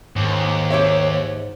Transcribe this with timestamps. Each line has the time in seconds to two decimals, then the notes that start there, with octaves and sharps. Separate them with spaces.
0.16 D#2 G#2
0.70 G4 C#5 E5